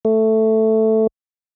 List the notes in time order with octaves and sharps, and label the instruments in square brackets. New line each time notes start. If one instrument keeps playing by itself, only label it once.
[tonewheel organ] A3